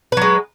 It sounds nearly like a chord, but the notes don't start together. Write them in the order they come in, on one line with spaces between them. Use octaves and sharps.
B4 F#3 G#3